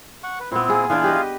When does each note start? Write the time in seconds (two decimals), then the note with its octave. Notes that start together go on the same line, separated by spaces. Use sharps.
0.23 F#5 C#6
0.40 B4
0.52 A#2 B3 C4 E4
0.69 F4 G#4
0.90 E3 D4 F4 G#4 D5 F5
1.04 G4 B4 D#5